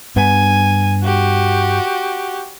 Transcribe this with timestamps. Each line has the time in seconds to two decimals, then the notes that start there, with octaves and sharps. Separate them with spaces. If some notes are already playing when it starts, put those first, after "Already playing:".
0.16 G2 B3 G#5
1.03 F#4 G4